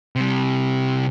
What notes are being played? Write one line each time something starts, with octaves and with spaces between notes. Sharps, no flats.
C3 G3